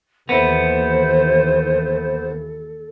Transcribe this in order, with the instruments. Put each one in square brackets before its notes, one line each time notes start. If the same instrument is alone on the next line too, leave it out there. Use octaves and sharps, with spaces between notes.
[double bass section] D#2 E3 [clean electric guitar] B3 E4 [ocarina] A4 [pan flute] C5